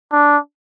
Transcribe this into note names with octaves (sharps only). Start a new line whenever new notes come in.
D4